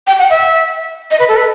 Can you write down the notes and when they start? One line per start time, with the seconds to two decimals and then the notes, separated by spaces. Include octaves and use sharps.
0.07 G5
0.19 F#5
0.30 E5
1.11 D#5
1.19 B4
1.28 A4
1.37 B4